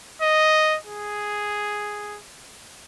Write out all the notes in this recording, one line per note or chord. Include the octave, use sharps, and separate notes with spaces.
D#5
G#4